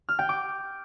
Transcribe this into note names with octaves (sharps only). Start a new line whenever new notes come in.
F6
G5
D6